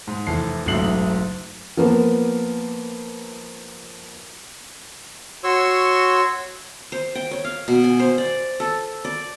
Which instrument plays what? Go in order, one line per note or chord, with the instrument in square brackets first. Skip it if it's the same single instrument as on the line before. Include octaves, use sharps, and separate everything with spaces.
[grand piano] G#2
F1 E3 A4 C7
F#1 B1 G#2 A3 C7 F#7
[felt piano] F3 A#3 B3
[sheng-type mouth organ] F#4 C#5 C6 C#6 E6
[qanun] C5
G5
C#5
F5
B2
G#5
C5
D5
A4
D5